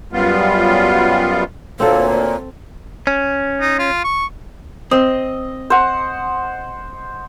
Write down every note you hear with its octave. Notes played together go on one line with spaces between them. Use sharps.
F#2 G3 B3 F4
D2 A#2 A#3 C4 A4 C#5
C#4
D#4
F4
C#6
C4 D#5
C5 F#5